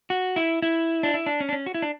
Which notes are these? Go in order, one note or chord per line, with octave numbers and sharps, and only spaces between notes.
F#4
E4
E4
D4
E4
D4
C#4
D4
C#4
F#4
E4
D4